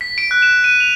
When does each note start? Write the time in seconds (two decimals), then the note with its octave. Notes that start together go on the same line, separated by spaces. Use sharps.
0.01 B6
0.18 D7
0.31 F#6
0.42 E7
0.64 D#7
0.80 F7